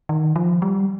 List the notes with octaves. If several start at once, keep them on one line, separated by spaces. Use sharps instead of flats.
D#3
F3
G3